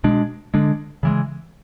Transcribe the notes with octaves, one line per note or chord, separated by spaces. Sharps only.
B2 G#3 D4
D3 G#3 D4
C#3 E3 G#3